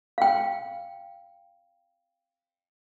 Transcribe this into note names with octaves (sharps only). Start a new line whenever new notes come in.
F5 G5